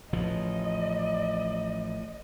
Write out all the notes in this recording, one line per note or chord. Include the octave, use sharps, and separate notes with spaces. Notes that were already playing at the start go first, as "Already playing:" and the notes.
A1 C#3 F3 D#5